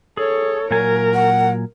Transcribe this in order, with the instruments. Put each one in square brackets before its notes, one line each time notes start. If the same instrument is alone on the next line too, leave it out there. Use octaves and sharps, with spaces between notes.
[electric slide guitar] G#4 [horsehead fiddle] A4 C#5
[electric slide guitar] A#2 F#3 G#5 [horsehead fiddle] A#4
[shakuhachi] F#5